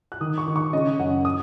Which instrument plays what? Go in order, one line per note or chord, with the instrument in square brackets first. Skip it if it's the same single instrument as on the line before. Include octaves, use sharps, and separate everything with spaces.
[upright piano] F#6
D#3 D#6
C#6
D#3
C#6
C#3 D#5
F#2 F#5
D#6